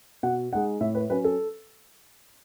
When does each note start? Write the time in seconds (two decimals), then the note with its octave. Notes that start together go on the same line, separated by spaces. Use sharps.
0.23 B2 F#5
0.53 G#3 D#4 F#5
0.81 A2 E5
0.95 B4
1.10 F#3 C#4 B4
1.24 A4